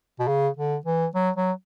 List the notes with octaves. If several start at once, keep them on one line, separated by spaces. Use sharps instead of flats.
B2
C#3
D3
E3
F#3
F#3